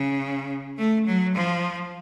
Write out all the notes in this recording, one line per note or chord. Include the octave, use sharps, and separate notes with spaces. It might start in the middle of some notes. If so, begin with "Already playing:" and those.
Already playing: C#3
A3
F#3
F3